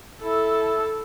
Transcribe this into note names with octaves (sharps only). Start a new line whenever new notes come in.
E4 A4